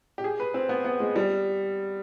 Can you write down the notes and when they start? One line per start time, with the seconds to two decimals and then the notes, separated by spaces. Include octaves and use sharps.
0.18 G4
0.24 G#4
0.40 B4
0.54 C4
0.69 B3
0.85 B3
1.00 G#3
1.16 G3